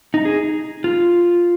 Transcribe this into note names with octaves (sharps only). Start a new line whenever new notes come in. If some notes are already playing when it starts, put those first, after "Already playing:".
D#4
G#4
F4